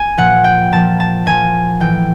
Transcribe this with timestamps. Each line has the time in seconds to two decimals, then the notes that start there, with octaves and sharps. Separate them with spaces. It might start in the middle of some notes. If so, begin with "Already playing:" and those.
Already playing: G#5
0.17 A#2 F3 F#5
0.44 G5
0.72 A#2 F3 A5
1.00 A5
1.26 A#2 F3 G#5
1.80 A2 E3 G5